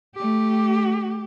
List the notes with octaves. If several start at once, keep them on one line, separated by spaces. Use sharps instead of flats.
A3 G4